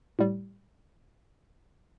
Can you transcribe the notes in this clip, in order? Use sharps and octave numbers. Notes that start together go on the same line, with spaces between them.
A2 G3